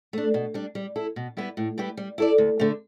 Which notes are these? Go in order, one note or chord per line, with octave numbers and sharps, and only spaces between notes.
A3 D4
B2
G3 D4
G3
E4 A4
B2
G3 B3 E4 B4
A2
G3 E4 G4 B4
G3
E4 A4 D5
D2
D3 A3